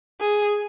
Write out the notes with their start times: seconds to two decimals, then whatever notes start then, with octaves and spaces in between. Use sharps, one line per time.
0.21 G#4